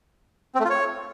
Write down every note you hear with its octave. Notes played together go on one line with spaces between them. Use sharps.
C4
A3
F4
C#5